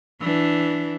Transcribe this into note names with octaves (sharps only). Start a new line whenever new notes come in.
E3 D4